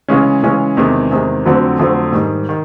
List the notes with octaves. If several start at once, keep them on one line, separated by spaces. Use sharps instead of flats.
C#3 E3 G#3 C#4
C#3 E3 G#3 C#4
E2 C3 D#3 G#3
E2 C3 D#3 G#3
F2 D3 F#3 A3 C4
F2 D3 F#3 A3 C4
G#2 D#3 G3
D#3